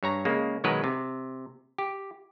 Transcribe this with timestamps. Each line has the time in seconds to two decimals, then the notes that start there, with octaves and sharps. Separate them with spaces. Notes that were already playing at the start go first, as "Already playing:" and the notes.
0.03 G2 C#5 A#5
0.25 C#3 G#3 A#3
0.64 B2 D#3 F#3 G#3 A#4 B4
0.84 C3
1.78 G4